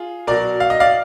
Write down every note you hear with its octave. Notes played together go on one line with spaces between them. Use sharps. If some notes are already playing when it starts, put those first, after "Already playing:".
Already playing: F4 G#4
B2 F#3 A#4 D5
F5
D#5
D5 F5